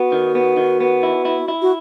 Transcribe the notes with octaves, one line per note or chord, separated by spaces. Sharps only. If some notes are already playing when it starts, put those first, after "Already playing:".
Already playing: B3 F#4
D#3
B3
D#3
B3
E4
E4
E4
F#4